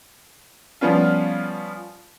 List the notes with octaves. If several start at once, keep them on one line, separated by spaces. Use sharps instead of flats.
F3 G3 B3 C#4 F4